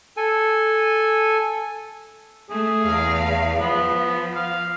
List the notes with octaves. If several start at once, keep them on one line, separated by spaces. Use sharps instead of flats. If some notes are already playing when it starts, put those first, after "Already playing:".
A4 G#5
A3 G#4
E2 F5
F3 B3
F5